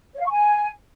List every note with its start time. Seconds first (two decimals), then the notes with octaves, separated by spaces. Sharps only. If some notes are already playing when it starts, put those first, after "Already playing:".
0.14 C#5
0.20 F5
0.25 C#6
0.31 G#5